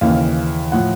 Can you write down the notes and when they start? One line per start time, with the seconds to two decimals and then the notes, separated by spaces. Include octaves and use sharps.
0.01 D#2 C#3 E3 F5
0.72 A2 F3 F#5